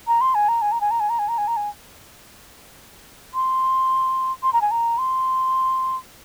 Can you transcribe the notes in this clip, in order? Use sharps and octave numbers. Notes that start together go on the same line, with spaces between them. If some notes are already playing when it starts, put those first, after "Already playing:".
A#5
C6
G#5
A#5
G#5
A#5
G#5
A#5
G#5
A#5
G#5
A#5
G#5
A#5
G#5
C6
C6
A#5
G#5
A#5
C6